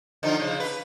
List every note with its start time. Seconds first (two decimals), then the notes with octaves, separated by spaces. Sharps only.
0.23 D3 F3 D#4
0.40 C#3 F3
0.60 B4